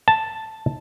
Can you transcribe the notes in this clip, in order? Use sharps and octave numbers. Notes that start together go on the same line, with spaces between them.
A5